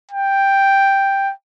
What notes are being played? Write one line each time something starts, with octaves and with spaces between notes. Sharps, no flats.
G5